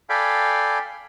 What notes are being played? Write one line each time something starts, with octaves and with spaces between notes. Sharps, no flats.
A4 D5 F5 G5 G#5 B5